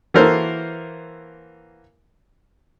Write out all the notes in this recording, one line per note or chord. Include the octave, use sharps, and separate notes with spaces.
E3 A#3 F#4 A4 A#4 C5